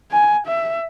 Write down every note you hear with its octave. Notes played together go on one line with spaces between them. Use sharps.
G#5
E5